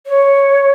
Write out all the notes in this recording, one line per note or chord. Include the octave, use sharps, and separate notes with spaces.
C#5